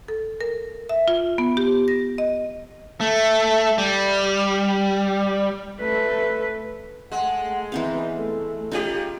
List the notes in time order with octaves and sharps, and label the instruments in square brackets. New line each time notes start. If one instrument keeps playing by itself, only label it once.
[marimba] A4
A#4
E5
F4
B3
G4
A#6
D#5
[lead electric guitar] A3
G3
[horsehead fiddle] A3 B4
[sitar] G#3 [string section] A3 A4 [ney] F#5
[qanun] E3 C5 F5 [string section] B3 D#4 B4 [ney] C4
[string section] A3 [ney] A4
[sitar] C#3 G4 [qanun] D#4 F4